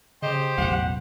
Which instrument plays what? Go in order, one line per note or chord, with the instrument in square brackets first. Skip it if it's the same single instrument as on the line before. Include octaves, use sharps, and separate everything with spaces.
[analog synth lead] C#3 [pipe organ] G4 C5 [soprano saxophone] D#5
[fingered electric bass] A1 E2 F#3 [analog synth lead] B2 [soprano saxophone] F#5